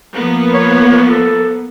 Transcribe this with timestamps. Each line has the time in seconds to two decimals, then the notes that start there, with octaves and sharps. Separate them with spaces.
0.14 F3 A#3 B3
0.54 C#5
1.09 A4